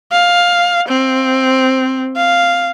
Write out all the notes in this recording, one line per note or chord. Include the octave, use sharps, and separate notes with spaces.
F5
C4
F5